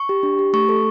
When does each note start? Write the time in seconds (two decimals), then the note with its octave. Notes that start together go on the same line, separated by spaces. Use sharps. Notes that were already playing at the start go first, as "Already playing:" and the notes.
Already playing: C#6
0.09 G4
0.23 D4
0.39 G4
0.53 A3 C#6
0.69 A4